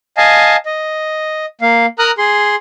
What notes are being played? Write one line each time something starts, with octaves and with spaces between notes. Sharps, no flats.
D#5 F5 G#5 A5
D#5
A#3 F5
A#4 A#5 D#6 F6 F#6
G#4 C6